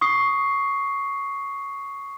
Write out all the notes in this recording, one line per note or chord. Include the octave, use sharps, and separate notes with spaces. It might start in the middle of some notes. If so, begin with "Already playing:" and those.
C#6 D#6 C7